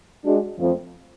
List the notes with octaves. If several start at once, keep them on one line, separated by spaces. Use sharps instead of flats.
G#3 D4 F#4
F2 F3 A3